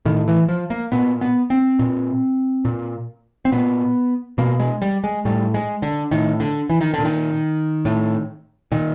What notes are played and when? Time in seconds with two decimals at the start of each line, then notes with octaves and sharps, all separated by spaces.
0.05 A2 D#3
0.28 E3
0.48 F3
0.70 A#3
0.92 A#2 B3
1.21 B3
1.50 C4
1.79 A#2
2.65 A#2
3.45 C4
3.52 A#2 B3
4.38 B2 A#3
4.60 G#3
4.82 G3
5.04 G#3
5.25 A2 G3
5.54 G#3
5.82 D3
6.11 A2 D#3
6.40 D3
6.70 E3
6.81 D#3
6.94 A#2 D3
7.05 D#3
7.85 A2
8.72 A#2 D#3